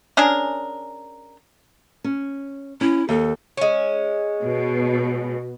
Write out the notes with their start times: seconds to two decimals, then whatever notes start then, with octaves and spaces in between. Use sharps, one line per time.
0.17 C#4 D4 G#4 A#4
2.04 C#4
2.81 C#4 E4
3.09 D#2 A4
3.57 G#3 C#4
4.43 B2